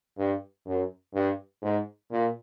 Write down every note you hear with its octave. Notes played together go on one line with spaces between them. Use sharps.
G2
F#2
G2
G#2
A#2